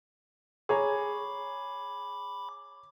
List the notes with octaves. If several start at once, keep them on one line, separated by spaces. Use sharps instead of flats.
G#4 C#5 A#5 B5 D6